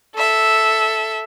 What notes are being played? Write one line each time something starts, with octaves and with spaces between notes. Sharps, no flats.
A4 E5